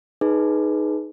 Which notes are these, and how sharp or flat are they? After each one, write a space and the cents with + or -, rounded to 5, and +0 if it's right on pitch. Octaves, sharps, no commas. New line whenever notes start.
D#4 +0 G#4 +15 B4 +0